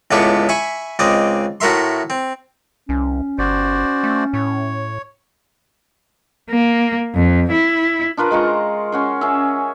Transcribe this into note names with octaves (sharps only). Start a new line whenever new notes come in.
C#2 A2 B3 A4 D5 C#6
E5 G#5 B5 C#6
C#2 C4 D5 D#5
A2 F#4 A#4 E5 C6
C4
C2 C#4
G1 F#4 C5 D5
A3
A2 C#5
A#3
F2
E4
D4 F4 A#4 B4
G#3 F4 A#5 C#6
C#4 F#4 C5
C#4 G#4 E5